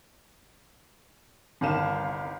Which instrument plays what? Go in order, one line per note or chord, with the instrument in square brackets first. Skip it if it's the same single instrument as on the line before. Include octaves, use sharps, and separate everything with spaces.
[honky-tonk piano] G1 C2 D#3 F5 E7